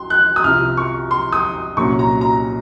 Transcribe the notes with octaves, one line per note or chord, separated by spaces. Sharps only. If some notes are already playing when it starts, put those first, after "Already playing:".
Already playing: C2 C6
F#6
D#6
C2 C3 F3 F6
C#6
C6
D#6
C2 A#2 F#3 C#4 C#6
A#5
A#5